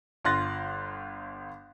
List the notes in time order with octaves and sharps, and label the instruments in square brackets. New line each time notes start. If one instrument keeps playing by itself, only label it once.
[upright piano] G1 F4 C6 F#6 A6 A#6